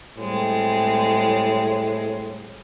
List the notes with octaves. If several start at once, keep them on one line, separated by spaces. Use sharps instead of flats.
A2 G3 G#3 C4